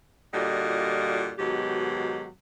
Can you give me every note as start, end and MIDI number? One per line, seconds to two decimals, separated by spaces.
0.33 1.31 46
0.33 1.31 50
0.33 1.31 55
0.33 1.31 65
0.33 1.31 66
0.33 1.31 75
1.39 2.26 44
1.39 2.26 47
1.39 2.26 51
1.39 2.26 54
1.39 2.26 67